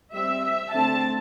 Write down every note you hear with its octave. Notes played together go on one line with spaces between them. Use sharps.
G3 C4 E5
E5
D3 A3 C4 A5